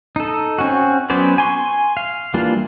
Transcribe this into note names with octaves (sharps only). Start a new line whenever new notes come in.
D#4 A4
C4 C#4 F#4
F#3 B3 C#4 C5 D5
G#5 C6 C#6
F5
E3 G3 A#3 D4 F4